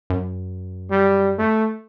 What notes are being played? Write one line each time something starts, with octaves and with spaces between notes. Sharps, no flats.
F#2
G3
A3